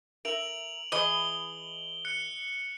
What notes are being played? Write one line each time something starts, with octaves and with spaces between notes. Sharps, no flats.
A#4 E5 D7 F7 F#7
E3 G#4 D#5 G7
F#6 C#7